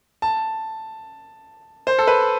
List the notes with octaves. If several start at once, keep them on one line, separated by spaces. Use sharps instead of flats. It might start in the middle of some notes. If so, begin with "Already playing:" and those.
A5
C5
A4
B4